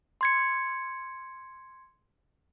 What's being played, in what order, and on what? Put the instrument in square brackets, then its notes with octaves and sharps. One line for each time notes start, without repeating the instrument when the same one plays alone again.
[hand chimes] C6 G#6 C#7